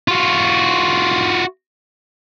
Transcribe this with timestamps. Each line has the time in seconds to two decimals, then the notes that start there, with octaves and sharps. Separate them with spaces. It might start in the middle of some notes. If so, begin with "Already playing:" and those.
0.08 F4 F#4